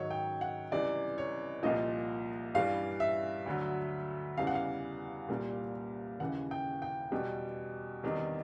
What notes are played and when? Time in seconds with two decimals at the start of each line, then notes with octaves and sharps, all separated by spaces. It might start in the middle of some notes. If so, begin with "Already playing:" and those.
Already playing: G#2 D#3 F#3 C#5
0.11 G5
0.41 F#5
0.71 C#2 C3 E3 G3 D5
1.18 C#5
1.63 C2 A#2 F3 D#5
2.55 G2 E3 G3 F5
3.00 E5
3.46 D2 D3 F#3
4.37 E2 C#3 E3 G3 F5
4.47 F#5
4.55 F5
5.28 C2 A#2 G3
6.20 D#2 C#3 E3 F#5
6.51 G5
6.82 G5
7.12 E2 B2 G3
8.03 E2 C3 D#3 G3